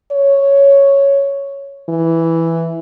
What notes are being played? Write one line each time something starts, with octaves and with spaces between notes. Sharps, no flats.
C#5
E3